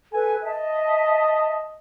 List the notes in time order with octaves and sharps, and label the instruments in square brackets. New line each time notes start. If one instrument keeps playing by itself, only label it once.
[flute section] A4 B4 [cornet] G#5
[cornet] D#5 [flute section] E5 A5